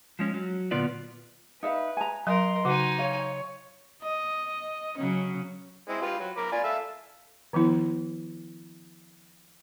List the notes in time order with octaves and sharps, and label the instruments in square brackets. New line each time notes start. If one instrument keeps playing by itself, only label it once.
[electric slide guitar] F3 G#3 C#4
F#3
A#2 D3 B3 F4 B4 D5
[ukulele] D#4 E5 F5 [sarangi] B4
[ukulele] G#5 A#5
[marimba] F#3 [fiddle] A#4 [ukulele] D#5 [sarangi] C6
[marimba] C#3 [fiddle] D#4 G#5 [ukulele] F#4
[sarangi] C#5 [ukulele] F5
[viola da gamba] D#5
C#3 F#3 C#4
[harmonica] G#3 C4 E4
F4 G4 B4
F#3
A#4 B5 D6
F4 D5 G#5
A4 E5 F5
[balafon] D#3 F3 B3 E4